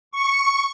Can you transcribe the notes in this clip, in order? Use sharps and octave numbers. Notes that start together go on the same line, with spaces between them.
C#6